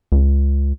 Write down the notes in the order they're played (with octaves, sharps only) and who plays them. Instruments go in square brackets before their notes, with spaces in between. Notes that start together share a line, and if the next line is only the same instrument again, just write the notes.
[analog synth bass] C#2